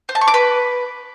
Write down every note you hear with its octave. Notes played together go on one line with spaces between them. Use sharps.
C5
A5
C#6
D6
B4